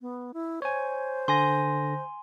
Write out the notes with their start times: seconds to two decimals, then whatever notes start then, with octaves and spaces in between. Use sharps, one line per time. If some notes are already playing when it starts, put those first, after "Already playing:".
0.01 B3
0.34 E4
0.62 C5 C#5 G#5
1.28 D3 G#5 C6 A#6